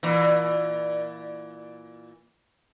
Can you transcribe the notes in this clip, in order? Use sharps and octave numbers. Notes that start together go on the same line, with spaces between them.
A#2 E3